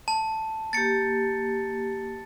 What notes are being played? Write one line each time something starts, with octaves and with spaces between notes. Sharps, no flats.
A5
A#3 G4 A6 C#7